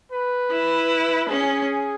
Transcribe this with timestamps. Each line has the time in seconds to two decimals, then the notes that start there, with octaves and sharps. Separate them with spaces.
0.12 B4
0.51 E4
1.29 C#4 G#4